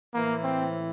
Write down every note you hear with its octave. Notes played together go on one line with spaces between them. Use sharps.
A2 E3 A#3
C4